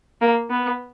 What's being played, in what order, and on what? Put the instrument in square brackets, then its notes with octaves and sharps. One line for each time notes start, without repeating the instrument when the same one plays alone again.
[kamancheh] A#3
B3